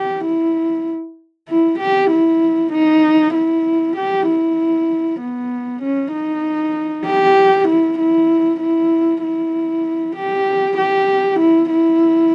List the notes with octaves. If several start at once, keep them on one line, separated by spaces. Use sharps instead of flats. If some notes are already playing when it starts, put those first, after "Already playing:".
Already playing: G4
E4
E4
G4
E4
D#4
E4
G4
E4
B3
C#4
D#4
G4
E4
E4
E4
E4
G4
G4
E4
E4